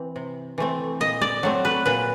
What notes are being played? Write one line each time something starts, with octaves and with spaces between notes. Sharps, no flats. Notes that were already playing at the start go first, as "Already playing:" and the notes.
Already playing: E3 C4
C3
E3 A3 C4
A#2 D#5
D5
F#3 A3 C4
B4
A#2 B4